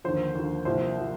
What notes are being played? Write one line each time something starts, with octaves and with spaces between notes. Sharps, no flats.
D#2 D3 F3 C5
D#2 D3 F3
C2 A#2 F3 C5
A#2 F3